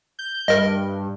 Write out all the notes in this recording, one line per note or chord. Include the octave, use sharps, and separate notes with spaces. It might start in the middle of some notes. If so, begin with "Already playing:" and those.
G6
G2 A#4 D#5